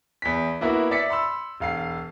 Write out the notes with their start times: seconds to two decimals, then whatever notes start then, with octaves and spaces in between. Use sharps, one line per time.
0.22 E2 B6
0.61 A#3 B3 E4 F#4
0.91 D5 E5 D6 B6 C#7
1.10 B5 C6 E6
1.60 E1 F5 C7